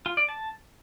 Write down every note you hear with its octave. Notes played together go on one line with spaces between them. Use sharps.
F4
D5
A5